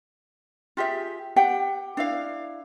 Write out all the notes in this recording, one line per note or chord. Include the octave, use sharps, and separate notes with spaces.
F4 G4 G#4 E5
G4 F#5 G5
D4 E4 F5